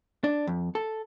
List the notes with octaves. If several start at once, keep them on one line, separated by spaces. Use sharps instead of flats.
D4
F2
A4